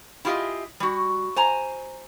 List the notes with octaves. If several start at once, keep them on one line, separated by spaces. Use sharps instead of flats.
E4 F4 G4 G#4 D#5 E5
G3 F#4
C5 G#5 A#5